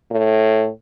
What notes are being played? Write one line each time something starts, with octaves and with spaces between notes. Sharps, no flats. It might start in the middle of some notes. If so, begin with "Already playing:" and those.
A2